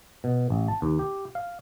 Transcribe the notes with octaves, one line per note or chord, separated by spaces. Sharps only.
B2
A1
A5
D#2
G4
F5